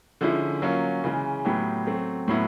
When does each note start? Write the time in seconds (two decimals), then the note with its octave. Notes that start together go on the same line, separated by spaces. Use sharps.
0.21 D3 F3 G#3 C#4 E4
0.62 F#3 A#3 C#4 F4
1.04 C#3 E3 G#3 C#4
1.45 A2 F#3 B3 E4 G4
1.87 F#3 A3 C4
2.28 A2 F#3 B3 E4